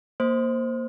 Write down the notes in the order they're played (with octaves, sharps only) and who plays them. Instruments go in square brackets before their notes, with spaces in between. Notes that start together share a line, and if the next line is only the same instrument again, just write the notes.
[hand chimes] A#3 C5